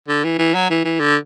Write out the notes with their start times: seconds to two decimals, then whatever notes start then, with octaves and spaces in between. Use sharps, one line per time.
0.08 D3
0.24 E3
0.38 E3
0.54 F#3
0.70 E3
0.84 E3
1.00 D3